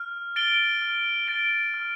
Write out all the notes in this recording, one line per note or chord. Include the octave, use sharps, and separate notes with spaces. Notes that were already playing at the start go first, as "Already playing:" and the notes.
Already playing: F6
A6 D7 G7
F6
A6 D7 G7
F6